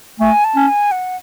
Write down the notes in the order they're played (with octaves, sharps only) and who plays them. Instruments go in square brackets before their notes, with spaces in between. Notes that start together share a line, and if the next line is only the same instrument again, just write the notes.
[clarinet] A3 [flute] G#5
[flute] A5
[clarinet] C#4
[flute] G#5
F#5